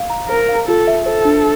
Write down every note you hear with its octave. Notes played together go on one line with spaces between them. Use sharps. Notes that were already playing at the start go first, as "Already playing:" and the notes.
Already playing: F5
A#5
A#4 C5
F5
F4 A4
E5
A4 C5
D4